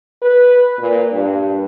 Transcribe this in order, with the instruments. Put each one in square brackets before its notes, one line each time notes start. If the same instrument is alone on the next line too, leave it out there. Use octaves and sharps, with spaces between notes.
[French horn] B4
A#2
G2